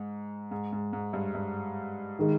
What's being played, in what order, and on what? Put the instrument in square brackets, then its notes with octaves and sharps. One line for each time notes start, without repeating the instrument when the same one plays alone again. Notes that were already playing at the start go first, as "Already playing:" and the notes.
Already playing: [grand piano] G#2
G#2
G#2
G#2
G2
G2
[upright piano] D#3 G#3